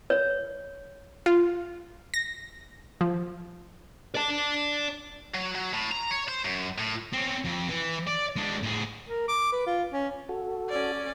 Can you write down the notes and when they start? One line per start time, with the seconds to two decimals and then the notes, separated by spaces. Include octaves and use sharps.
0.10 C#5
1.26 F4
2.14 A#6
3.01 F3
4.15 D5 A5
5.34 F#3
5.55 F#3
5.73 A2
5.92 A#5
6.11 C#5
6.28 C5
6.45 F#2
6.78 A2
7.13 C4 C#4
7.45 F2
7.69 E3
8.07 D5
8.37 G#3 D4
8.64 A2 G#4
9.09 A#4
9.28 D6
9.52 B4
9.67 F4
9.93 C#4
10.29 F#4 A4
10.69 C#4 D5